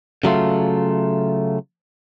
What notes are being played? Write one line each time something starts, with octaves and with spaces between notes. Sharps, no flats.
C#3 F#3 A3 F4